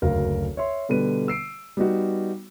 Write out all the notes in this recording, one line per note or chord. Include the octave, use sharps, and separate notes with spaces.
F#1 D2 A#4 F5
C#5 E5 C6
B2 D3 G3 B4 D#7
E6 C7 D7
G3 B3 D#4 F#4